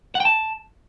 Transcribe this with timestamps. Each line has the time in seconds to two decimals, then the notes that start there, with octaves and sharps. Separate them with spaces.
0.15 F#5
0.20 G5
0.25 A5